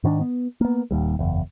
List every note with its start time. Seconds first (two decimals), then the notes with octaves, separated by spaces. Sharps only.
0.04 G#2 D#3 C4 D4
0.21 B3
0.61 A#3 B3
0.91 D#1 D#2 G3
1.19 F#1 E2